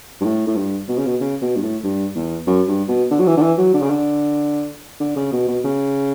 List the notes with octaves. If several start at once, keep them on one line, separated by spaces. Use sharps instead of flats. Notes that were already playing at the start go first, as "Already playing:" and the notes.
G2
A2
A2
G2
B2
C#3
B2
C#3
B2
G2
A2
G2
E2
F#2
G2
B2
D3
F#3
E3
D3
E3
F#3
D3
C#3
D3
D3
C#3
B2
B2
C#3